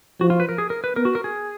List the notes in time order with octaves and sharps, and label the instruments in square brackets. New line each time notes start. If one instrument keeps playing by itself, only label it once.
[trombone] F3 [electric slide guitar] F#4
[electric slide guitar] F4
B4
A#4
G#4
A#4
B4
[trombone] B3 [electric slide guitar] A#4
[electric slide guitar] F#4
A#4
G#4